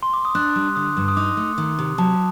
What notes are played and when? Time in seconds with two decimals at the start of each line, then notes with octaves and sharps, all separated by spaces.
0.03 C6
0.13 D6
0.25 D#6
0.35 D4 F#6
0.56 G3
0.76 D3 D#6
0.97 G2
1.08 D#6
1.16 D#4 D6
1.37 A3
1.58 D#3
1.79 C3
1.98 F#3 A5